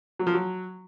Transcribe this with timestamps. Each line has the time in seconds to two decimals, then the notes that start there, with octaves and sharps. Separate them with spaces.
0.19 F#3
0.27 F3
0.34 F#3